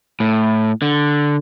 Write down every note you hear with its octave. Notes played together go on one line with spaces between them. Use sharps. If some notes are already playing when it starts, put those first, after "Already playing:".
A2
D3